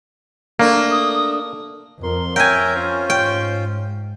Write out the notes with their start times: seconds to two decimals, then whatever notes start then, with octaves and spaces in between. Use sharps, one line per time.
0.59 A3 A#3 D4
0.91 D#6
2.03 F2 A#4 C6
2.36 A#4 C#5 E5 G5 G#5 A#5
2.75 C#4 F4 C5
3.10 G#2 G5